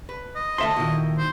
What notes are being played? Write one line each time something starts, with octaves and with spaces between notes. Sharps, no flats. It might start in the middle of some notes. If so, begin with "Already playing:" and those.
B4
D#5
D2 F4 A4 E5 C6
A#2 D#3 E4 F#4 G4
C5